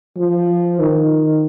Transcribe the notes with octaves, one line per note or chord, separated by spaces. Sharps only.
F3
D#3